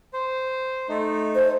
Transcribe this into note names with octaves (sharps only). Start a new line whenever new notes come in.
C5
A3 D#4
C5